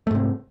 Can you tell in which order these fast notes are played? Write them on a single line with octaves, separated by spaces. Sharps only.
A3 G#2 C3